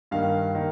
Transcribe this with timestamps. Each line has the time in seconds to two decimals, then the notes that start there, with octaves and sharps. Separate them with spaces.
0.11 G2 D#3 A#3 F5
0.55 D#3 A#3